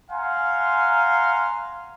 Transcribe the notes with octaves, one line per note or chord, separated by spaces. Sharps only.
F5 F#5 G#5 A#5 C6